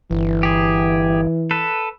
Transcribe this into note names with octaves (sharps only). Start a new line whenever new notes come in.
G1 E3
G4 G#4
A4 B4